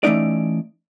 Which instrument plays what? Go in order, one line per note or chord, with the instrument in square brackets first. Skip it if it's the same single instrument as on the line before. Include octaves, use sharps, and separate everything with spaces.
[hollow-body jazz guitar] E3 A3 C#4 D#4 D5